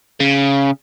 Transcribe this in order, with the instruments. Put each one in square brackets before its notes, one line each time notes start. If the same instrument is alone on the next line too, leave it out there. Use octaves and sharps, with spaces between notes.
[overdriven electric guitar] C#3